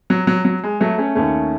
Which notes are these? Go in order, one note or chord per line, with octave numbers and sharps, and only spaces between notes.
F#3
F#3
F#3
G#3
F#3 A3
A3 C#4
D#2 D#3 A3 C#4